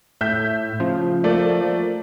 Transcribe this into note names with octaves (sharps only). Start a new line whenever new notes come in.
A2 E5 G6
C#3 F3
A3 A#3 D5